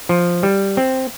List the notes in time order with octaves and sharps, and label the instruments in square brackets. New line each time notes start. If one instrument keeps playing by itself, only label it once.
[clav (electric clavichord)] F3
G3
C4